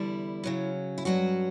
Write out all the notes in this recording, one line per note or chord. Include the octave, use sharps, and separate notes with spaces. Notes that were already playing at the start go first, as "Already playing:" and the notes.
Already playing: E2 D3 G3 E4
C#3 F#3 C#4
E4
G2 F#3 C#4 F#4